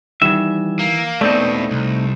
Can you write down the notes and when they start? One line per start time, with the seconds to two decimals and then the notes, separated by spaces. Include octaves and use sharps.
0.22 D#3 E3 G3 E5
0.79 A#3
1.21 E2 B2 A3 C4 D#4 D5
1.71 C2